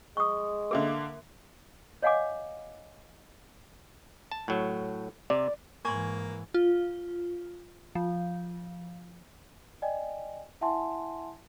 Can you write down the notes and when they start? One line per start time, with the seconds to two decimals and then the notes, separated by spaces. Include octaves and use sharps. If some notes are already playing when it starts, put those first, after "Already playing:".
0.17 G#3 C#6 D#6
0.71 D3 A#3 A#4 E5 D6
2.02 C#5 D#5 F5 F#5 G#5 D6
4.31 A5
4.48 A2 F#3
5.30 C3 D5
5.85 G#2 E3 A#3 G#5 C6 C#6
6.54 F4
7.95 F3
9.82 D5 D#5 G5 G#5
10.61 E4 E5 F#5 G#5 A5 C6